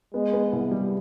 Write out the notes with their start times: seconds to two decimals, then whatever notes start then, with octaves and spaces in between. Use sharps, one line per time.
0.14 G#3 B3
0.33 B3
0.53 C2
0.71 G3